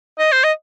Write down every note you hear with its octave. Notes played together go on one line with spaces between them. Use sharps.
D#5
C5
D#5